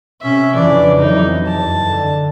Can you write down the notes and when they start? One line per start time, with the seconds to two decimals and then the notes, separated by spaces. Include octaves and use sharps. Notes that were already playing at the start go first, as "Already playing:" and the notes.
0.22 C3 C#4 E5
0.55 F2 C#3 E3 D4 D5
0.98 F2 E3 F#3 D#4
1.46 F#1 E2 A5
1.82 D3